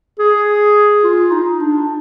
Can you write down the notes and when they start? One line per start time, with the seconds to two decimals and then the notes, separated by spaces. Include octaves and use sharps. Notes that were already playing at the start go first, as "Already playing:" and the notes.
0.19 G#4
1.04 F4
1.32 D#4
1.60 D4